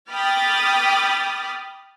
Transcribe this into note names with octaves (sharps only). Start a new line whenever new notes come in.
G5 B5 D6 D#6 F6 A6